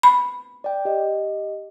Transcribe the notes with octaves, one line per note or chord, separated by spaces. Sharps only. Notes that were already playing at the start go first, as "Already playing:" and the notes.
B5
D5 G5
G4 D#5